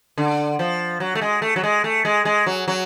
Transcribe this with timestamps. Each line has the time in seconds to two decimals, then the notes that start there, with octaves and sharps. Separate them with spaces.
0.18 D3
0.59 F3
1.00 F#3
1.15 A3
1.21 G#3
1.42 A3
1.56 F#3
1.63 G#3
1.84 A3
2.05 G#3
2.25 G#3
2.46 F#3
2.68 F#3